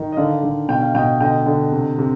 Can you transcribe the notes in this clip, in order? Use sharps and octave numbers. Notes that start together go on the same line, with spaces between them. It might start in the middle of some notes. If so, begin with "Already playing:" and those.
Already playing: D#3
D#5
D3 D5 F5
D3
B2 G5
F5
B2 D#5 G5
D3 D#5 G5
D3
C3
C3